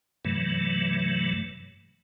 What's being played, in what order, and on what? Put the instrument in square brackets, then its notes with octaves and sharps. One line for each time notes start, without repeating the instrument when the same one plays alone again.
[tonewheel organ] G2 C3 E3 F#3 A3